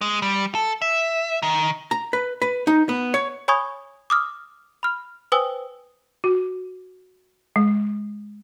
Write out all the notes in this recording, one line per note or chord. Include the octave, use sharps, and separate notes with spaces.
G#3
G3
A4
E5
D#3
A#5
B4
B4
D#4
B3
C#5
C#5 G#5 B5 C#6 D#6 G#6
D6 D#6 F6
B5 F6
B4 C5 G5 G#5 D#6 E6
F#4
G#3